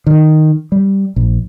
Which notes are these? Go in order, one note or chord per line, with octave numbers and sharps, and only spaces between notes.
D#3
G3
A#1